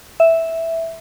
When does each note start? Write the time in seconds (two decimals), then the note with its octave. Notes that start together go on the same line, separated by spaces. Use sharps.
0.20 E5